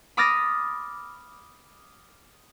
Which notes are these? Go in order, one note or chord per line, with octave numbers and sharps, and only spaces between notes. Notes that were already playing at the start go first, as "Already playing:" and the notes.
B5 D6 D#6 F6 A6 A#6